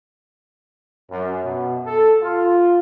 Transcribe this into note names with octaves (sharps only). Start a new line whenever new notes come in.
F#2
B2
A4
F4